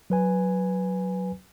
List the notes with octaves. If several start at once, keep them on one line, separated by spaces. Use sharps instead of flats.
F#3 B4 G#5